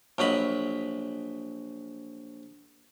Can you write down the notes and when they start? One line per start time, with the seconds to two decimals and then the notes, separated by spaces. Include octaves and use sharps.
0.18 A#1 F#3 D#5 B5